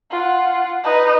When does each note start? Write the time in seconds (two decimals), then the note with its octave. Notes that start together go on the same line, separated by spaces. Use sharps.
0.11 F4 F#5
0.84 D#4 B4